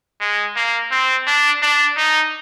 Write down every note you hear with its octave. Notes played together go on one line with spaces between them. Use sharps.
G#3
A#3
C4
D4
D4
D#4